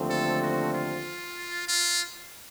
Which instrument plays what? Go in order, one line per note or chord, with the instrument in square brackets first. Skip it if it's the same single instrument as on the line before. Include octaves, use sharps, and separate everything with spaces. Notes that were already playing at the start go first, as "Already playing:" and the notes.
Already playing: [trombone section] D#2 D3 F3 A3 C4
[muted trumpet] A4
F#4
F4
F4